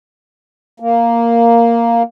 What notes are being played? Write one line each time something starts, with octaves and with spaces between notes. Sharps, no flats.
A#3